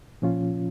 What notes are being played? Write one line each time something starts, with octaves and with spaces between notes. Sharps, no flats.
A#2 F3 C#4 F4